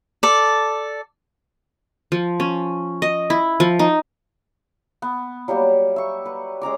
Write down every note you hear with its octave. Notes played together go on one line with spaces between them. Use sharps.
A4 D5
F3
C#4
D#5
E4
F3
D#4
B3
F#3 G3 A#3 G4
E5 C#6
B4
G#3 C#4 A#5 D6